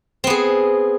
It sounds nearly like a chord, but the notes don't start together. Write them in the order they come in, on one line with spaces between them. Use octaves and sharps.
C4 B3 G#4